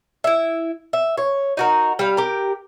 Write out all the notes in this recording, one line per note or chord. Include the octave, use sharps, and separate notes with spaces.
E4 E5
E5
C#5
D#4 F#4 A#4
G3 F5
G4 A#4